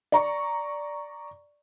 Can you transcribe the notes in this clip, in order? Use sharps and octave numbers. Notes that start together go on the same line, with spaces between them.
D5 A#5 C#6